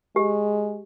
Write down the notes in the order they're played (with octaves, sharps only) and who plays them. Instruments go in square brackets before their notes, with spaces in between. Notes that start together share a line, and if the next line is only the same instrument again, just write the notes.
[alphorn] G#3 [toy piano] G4